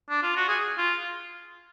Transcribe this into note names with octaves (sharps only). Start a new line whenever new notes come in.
D4
F4
F#4
G#4
F4